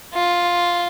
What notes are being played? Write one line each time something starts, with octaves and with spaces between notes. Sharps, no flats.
F4